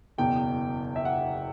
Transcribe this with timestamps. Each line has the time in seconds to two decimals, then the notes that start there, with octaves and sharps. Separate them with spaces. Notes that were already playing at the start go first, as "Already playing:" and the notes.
0.18 F#1 E2 B2 G5
0.96 E5
1.05 F#5